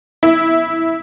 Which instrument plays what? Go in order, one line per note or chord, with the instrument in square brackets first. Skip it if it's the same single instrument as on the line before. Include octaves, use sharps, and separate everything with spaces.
[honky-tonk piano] E4